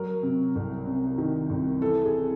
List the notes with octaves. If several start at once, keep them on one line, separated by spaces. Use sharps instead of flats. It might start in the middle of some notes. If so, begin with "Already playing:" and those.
Already playing: F#3 A#4
C3
C2
C3
D#3
C2
E3 A4
G#4